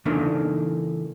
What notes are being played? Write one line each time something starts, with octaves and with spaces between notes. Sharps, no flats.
C#3 E3 A3 A#3 D4 D#4